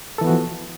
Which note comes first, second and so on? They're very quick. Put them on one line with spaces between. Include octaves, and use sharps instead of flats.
A4 E3 B3 F#4 F3